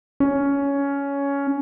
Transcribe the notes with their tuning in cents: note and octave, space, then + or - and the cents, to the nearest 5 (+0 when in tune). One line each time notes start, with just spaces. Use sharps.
C#4 +15